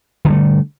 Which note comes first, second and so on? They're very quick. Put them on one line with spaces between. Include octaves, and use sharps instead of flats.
D3 D#3 G3 A3